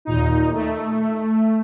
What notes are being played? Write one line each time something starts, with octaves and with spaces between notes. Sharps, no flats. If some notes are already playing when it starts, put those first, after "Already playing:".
D#2 A#2 D#4
A3